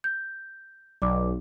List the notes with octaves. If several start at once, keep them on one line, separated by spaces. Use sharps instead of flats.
G6
B1 D5 D6